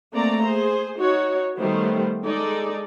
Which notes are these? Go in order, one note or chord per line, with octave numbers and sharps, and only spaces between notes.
A3 A#3 C4 D5 A#5
G#4 C5
D#4 F#4 C#5
D#3 G3 A3 B3 C5
G#3 D#4 A4 D5